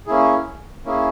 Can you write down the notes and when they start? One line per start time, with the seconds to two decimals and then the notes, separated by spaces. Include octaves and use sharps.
0.06 A#3 C#4 E4 G#4
0.85 A#3 C#4 E4 G#4